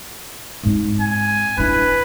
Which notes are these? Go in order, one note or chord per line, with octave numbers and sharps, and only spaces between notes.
G#2 C4
G#5
D4 E4 B4